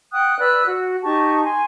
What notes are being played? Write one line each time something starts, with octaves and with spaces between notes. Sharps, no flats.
F#5 G5 D#6 F#6
B4 D5 E6 F#6
F#4 F#5
D#4 G4 A5 C#6
G#5 C6